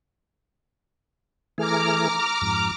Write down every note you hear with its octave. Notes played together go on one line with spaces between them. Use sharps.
E3 A3 G#4 A#5 D6 F6
F2 G#2